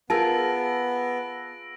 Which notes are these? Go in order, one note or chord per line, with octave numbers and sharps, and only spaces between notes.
B3 F4 G#4 A#4 A5 E6 A#6 D7